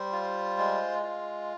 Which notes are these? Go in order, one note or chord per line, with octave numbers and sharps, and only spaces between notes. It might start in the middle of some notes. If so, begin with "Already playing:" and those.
Already playing: G3 C5
F4
G#3
F4